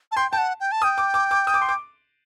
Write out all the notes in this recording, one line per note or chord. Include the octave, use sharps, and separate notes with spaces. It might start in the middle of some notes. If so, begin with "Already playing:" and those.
A5
G5 C6
G5 A5
F#5
G5
A5
G5 D#6
D6
D6
D6
D#6
D6
C6
D6